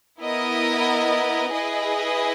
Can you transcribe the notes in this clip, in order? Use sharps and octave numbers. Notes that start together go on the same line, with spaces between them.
B3 E4 A#4 D#5
E4 G#4 B4 D#5